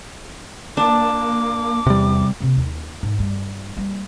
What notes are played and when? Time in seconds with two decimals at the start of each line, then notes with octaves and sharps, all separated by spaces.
0.77 A#3 D4 D6
1.86 E2 C3 G3
2.40 C3 A#3
2.57 D#2
3.03 G#2
3.18 G2 G3
3.77 G3 A#3